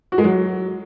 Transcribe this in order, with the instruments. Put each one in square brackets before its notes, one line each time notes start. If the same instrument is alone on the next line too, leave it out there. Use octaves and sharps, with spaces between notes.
[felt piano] F#4
G#3
F#3